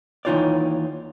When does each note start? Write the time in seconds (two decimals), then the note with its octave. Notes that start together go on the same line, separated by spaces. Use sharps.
0.25 D#2 E3 D#4 F4 C#5 D5